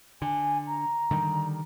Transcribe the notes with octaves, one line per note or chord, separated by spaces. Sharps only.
D3 G#5
A#5
D3 D#3 G3